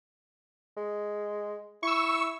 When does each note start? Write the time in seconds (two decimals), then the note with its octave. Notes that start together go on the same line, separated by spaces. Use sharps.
0.77 G#3
1.83 E4 C#6 E6